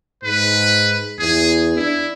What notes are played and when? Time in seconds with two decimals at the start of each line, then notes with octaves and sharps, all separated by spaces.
0.23 G#2 B4
1.19 E2 G#4
1.76 D4 E4